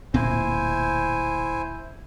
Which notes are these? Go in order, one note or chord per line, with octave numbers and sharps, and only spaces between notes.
D1 A#2 C4 E4 C5 G#5